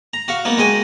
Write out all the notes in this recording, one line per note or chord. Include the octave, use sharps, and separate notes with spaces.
A#5
F#4 F5 C#6
A#3 B3 D#4
G#3 F#4 D#5 G5 G#5